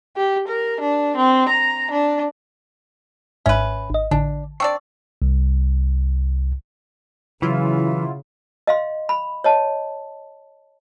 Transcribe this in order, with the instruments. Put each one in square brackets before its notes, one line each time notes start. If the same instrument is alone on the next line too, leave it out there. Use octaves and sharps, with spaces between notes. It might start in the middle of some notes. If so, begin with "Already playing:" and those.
[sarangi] G4
A#4
D4
C4
A#5
D4
[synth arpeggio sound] G#1 G#2 E5 [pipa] C#4 B4
[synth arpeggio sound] G#1 D#5
[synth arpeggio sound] A1 D3 [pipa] D4
[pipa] C4 D4 D5 [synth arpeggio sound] C#6 E6
[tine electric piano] C2
[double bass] C#3 [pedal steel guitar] E3 [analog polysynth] F#3 E4 F4
[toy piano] D#5 F5 C6
B5
C#5 D#5 A5